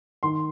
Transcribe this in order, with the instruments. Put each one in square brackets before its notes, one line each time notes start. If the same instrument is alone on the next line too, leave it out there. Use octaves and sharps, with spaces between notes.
[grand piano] D#3 C6